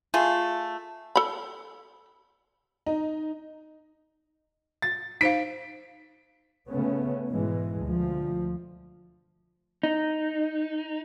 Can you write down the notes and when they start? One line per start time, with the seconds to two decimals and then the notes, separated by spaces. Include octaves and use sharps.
0.14 A3 F4 G#4
1.16 A4 B5
2.86 D#4
4.82 A6
5.21 D#4 C5 F5 B6 D7
6.69 C#3 A3 B3 C#4
7.29 G#2 B2 E3 G#3
7.81 D2 F3
9.83 D#4